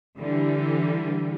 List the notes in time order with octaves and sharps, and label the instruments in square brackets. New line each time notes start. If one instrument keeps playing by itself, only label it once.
[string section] D3 E3 G3